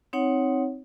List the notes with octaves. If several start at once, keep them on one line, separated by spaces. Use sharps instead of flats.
C4 D#4 C#5 F#5